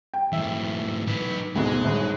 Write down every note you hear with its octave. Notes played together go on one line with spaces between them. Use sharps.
G5
G#2 E3 E5
D#4 B4
D2 G#2 B2 G#3
G1 G#2